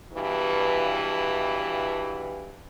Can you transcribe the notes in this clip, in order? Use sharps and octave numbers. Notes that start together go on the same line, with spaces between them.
E2 G2 B2 E3